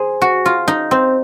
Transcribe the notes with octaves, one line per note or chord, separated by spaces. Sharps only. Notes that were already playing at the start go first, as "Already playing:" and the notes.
Already playing: G#4 C5
F#4
F4
D#4
C4